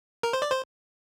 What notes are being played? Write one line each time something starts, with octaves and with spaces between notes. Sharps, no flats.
A#4
C5
D5
C5